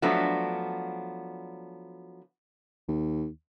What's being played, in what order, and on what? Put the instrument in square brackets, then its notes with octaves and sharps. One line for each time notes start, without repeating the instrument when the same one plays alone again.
[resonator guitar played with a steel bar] F3 F#3 A3 B3 D4
[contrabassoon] D#2